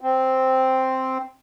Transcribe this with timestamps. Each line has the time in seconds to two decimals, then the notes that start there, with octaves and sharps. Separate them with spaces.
0.01 C4